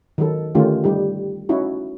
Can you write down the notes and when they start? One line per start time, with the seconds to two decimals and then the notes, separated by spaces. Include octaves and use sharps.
0.18 D#3 F#3 A4
0.55 D3 D#3 A3 C#4 F4 G4
0.84 G3 D#4 G4
1.49 C#4 D#4 E4 F#4